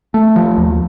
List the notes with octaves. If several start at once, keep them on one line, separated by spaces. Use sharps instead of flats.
A3
F3
D#2